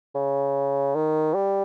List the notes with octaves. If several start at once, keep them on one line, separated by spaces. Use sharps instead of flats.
C#3
D#3
G3